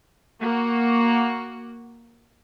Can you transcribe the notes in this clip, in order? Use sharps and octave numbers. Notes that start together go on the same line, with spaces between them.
A#3 F#4